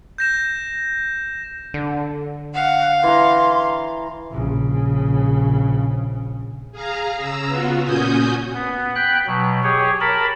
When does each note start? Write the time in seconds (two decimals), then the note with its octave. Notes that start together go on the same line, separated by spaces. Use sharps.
0.18 G6 A#6 E7
1.74 D3
2.54 F5 F#5
3.03 E3 A#5 C6
4.31 A#1 C#3
6.72 G#4 F5 A#5
7.16 C#3 A#5 E6
7.47 B3 F4 F#4
7.84 A#2 C#4 F#4 G#5 D#6 G6
8.54 B3
8.95 G5 B5 F#6
9.27 B2 F#3
9.63 G4 G#4 C#5
10.01 A#4 A5 B5